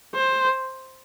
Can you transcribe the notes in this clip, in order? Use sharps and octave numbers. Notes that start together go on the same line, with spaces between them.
C5